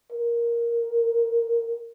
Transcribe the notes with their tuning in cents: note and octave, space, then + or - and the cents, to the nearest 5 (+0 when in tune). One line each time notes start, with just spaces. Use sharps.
A#4 +5